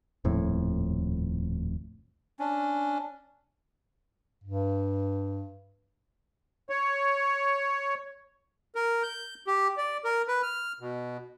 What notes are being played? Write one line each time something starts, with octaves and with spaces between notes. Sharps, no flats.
D#1 F2 A2
C#4 D4
G2
C#5
A#4
G6
G4
D5
A#4
B4
F6
B2